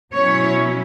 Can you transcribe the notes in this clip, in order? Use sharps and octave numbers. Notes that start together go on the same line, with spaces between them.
B2 F#3 C#4 E4 C#5